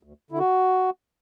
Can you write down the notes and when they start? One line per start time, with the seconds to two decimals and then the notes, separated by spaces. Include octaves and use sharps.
0.03 D2
0.31 D3 E4
0.39 F#4